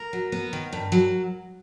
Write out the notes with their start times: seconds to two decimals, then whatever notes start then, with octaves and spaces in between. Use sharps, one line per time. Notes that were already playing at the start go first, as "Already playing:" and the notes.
Already playing: A#4
0.13 F#3
0.32 B3
0.53 D#3
0.73 G2
0.92 F#3